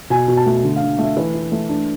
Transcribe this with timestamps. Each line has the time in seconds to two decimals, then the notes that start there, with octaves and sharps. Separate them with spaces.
0.10 B2 G#5
0.28 B2
0.37 A5
0.46 A3
0.64 D3
0.76 F5
0.82 D3
0.99 A3 E5
1.17 E3 B4
1.34 E3
1.52 A3
1.69 D4